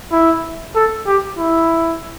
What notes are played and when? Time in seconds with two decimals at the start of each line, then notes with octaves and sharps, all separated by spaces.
0.12 E4
0.75 A4
1.07 G4
1.38 E4